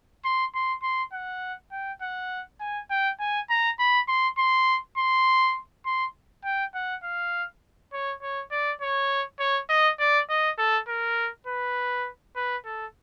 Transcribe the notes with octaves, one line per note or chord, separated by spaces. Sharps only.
C6
C6
C6
F#5
G5
F#5
G#5
G5
G#5
A#5
B5
C6
C6
C6
C6
G5
F#5
F5
C#5
C#5
D5
C#5
C#5
D#5
D5
D#5
A4
A#4
B4
B4
A4